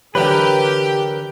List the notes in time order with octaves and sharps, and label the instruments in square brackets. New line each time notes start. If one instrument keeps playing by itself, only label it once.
[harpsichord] D3 E3 F#3 [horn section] G4 [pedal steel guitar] A#4 B4